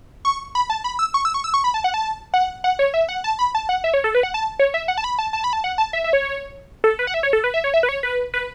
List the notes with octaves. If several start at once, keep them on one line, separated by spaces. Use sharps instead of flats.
C#6
B5
A5
B5
E6
C#6
E6
C#6
E6
C#6
B5
A5
F#5
A5
F#5
F#5
C#5
E5
F#5
A5
B5
A5
F#5
E5
C#5
A4
B4
F#5
A5
C#5
E5
F#5
A5
B5
A5
A5
B5
A5
F#5
A5
E5
E5
C#5
A4
B4
F#5
E5
C#5
A4
B4
E5
C#5
E5
B4
C#5
B4
B4